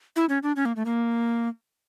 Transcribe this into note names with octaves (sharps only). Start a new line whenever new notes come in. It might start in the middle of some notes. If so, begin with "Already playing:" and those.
E4
C#4
D4
C#4
A#3
A3
A#3